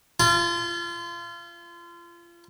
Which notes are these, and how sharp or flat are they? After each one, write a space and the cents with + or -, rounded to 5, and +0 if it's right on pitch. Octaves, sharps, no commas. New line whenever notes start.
F4 -30 A5 +0